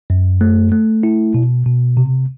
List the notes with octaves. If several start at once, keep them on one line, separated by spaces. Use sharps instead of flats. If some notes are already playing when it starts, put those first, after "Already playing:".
F#2
A3
A3
E4
B2
B2
C3